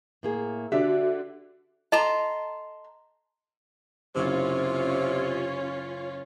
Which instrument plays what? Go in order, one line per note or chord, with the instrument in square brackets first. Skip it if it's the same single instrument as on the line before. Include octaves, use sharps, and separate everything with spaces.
[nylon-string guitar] A2 A#3 G#4
[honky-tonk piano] D3 D4 [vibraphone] F#4 [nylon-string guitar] G4 E5
[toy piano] A4 D#5 [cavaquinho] A5 A#5 C6
[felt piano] F#1 [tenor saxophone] C3 [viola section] C#4 F4 C#5